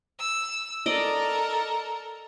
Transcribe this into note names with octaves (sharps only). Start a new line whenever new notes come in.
E6
A4 A#4 D5 D#5